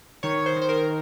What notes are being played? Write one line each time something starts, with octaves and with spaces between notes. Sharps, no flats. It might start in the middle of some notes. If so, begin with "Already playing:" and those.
D#3 C#5
C5
D#3
C5
A#4